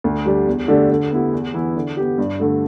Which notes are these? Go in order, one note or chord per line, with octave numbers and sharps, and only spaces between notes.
D2
D3 G3 D4 G4
E2
D3 A3 D4 G4
D3
B3 E4 G4
E2
E3 B3 E4
D3
B3 G4
G2
D3 A3